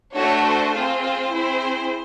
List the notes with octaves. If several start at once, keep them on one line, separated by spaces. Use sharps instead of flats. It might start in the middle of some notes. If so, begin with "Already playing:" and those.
A3 D4 F#4 A4 C#5
C5
C4 F4 G#4
C5
C4 E4 G#4